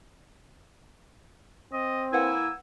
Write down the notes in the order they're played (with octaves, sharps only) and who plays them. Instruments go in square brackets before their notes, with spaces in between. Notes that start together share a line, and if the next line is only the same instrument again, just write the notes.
[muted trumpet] C4 [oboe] D#5
[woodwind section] A#3 E4 G#5 [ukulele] B4 F#5 [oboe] E6